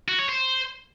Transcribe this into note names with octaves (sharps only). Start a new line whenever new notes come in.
F#4
C#5
C5